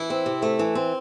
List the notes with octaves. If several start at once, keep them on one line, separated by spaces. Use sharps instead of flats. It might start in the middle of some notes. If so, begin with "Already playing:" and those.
Already playing: E3 E4
C4
C3
A3
E3
C4